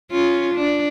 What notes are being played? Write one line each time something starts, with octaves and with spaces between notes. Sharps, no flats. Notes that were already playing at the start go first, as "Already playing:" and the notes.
C#4 F4
D4